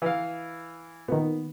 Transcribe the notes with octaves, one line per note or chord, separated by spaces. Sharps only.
E3 F5
A#2 D#3 B3